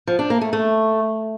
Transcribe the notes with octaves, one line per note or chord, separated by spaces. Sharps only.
F3
D4
A#3
A3
A3